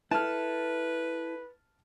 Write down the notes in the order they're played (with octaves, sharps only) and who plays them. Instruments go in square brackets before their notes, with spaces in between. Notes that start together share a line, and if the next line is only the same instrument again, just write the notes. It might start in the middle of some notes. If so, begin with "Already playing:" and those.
[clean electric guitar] E4 A4 [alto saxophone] B4 [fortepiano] A5 F6